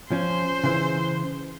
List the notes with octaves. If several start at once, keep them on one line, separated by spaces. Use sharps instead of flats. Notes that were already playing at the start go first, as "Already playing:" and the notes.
F3 C#4 C5
C#3 E3